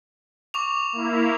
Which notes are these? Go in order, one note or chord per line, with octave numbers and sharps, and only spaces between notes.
C#6 D6 F7
A#3 E4